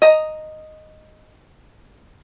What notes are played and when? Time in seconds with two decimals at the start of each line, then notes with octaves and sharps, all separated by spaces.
0.02 D#5 A#5